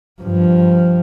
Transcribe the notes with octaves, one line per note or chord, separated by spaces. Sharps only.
G2 F3